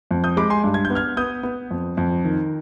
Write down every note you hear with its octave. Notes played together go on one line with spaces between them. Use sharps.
F2
D#6 G6
G#3 B5 D6
G#5 C6
G2
G#6
G6
B3
F6 G#6
B3 D#6 G6
B3
F2
F2
D#3